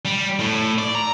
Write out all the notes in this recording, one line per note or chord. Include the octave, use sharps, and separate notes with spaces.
G3
A2
D5
A#5